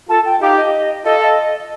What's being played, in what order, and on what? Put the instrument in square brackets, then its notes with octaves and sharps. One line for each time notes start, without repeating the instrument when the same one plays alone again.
[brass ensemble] F4 A4 [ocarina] A5
[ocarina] G5
[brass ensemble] D#4 G4 [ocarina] F5
[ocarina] D#5
[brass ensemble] F4 A4 [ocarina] D#5
[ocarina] F5
D#5